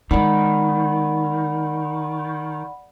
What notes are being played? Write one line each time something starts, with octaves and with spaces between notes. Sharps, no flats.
D#3 G#3 B3 D5 F#5 B5